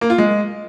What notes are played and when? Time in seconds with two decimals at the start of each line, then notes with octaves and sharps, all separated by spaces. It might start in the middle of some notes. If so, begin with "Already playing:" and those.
0.01 A#3
0.10 F4
0.18 G#3